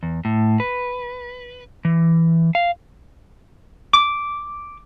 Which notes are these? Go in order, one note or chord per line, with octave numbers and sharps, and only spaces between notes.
E2
A2
B4
E3
F5
D6